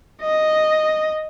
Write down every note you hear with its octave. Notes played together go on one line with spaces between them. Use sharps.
D#5